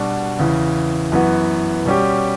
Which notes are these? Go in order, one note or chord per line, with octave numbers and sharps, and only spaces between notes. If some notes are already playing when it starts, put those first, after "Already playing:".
Already playing: B2 G3 D4 F#4
E2 C#3 E3
F#2 E3 B3 F#4
B2 G3 C#4 G4